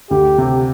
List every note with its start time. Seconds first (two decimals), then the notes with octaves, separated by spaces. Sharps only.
0.11 D2 G4
0.38 C3